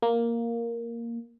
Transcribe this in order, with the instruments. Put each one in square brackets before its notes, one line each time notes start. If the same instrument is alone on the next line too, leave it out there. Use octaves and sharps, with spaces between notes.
[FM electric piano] A#3